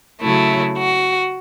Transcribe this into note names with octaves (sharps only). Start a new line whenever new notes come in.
C#3 F#3 A3 E4
F#4